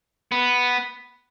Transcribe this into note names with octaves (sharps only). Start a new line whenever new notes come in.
B3